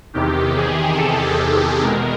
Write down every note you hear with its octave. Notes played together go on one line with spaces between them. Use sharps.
E2 C3 D#3 G4
G#4
A4
E2 B2 G#3 A#4